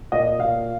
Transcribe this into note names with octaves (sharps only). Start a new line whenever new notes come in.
A#2 D#5
A#2 F5